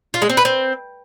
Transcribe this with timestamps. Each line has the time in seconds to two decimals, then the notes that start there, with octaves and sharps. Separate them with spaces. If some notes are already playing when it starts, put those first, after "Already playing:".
0.14 F4
0.22 G#3
0.29 C4
0.37 B4
0.45 C4